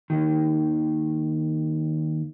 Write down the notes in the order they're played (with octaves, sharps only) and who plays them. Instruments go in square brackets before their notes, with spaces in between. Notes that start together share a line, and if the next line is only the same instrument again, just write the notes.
[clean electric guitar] D#2 D#3